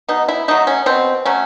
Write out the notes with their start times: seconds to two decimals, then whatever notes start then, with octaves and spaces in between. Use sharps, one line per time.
0.09 B2 D#4
0.28 E4
0.48 F#3 A3 D#4
0.67 C#4
0.86 B2 C4
1.25 F#3 A3 C#4